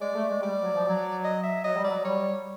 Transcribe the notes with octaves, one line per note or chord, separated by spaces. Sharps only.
G#3 D5
A3
G#3
G3 D5
F#3
F3
F#3
D#5
E5
F#3 D#5
G3
F#3 D5
G3 C#5